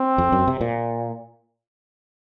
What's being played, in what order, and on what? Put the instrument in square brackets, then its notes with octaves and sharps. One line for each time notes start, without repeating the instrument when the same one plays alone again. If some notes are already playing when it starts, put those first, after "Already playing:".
Already playing: [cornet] C4
[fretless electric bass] F2
F#2
C3
A#2